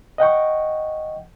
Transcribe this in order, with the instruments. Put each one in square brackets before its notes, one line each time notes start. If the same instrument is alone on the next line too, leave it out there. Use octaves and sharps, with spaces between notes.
[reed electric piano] D#5 F#5 G5 C#6